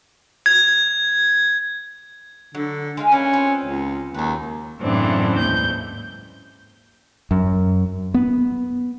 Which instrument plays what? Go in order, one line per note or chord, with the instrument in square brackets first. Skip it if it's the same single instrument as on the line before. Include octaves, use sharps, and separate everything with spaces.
[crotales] G#6
[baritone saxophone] D3 [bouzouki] F#3
[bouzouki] G#3 G#4 F5
[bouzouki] A#3 D4 E4 [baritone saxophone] C#4
[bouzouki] C4 F4 B4
[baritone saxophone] C#2
[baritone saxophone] D#2 [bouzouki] F#3 B4
[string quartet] F#2 A2 C#3 E3 C4 D4
D#2 G#2 G6
[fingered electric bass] F#2
B3